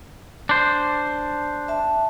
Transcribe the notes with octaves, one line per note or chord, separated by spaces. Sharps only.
D4 C5
E5 A5